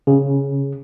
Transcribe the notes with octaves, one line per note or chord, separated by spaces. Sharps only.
C#3